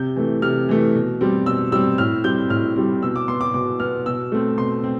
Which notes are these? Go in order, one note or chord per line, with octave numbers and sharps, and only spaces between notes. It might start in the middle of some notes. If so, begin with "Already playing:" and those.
Already playing: C3 G6
E3 A3
C3 F6
E3 A3
B2
G3 C4
B2 E6
G3 C4 E6
A2 F6
G3 C4 G6
A2 F6
G3 C4
B2 E6
D6
B3 C6
D6
B2 D6
B3 F6
B2 E6
A3 C4
B2 C6
C4